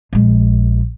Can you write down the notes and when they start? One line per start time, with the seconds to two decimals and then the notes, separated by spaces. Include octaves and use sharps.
0.13 A#1 G#3